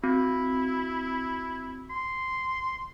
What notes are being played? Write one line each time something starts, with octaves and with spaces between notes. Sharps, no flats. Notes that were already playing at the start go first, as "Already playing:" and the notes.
C4 E4 F#4
C6